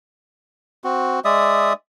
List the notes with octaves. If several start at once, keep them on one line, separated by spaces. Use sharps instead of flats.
C4 F#4
G#3 D5 E5 D#6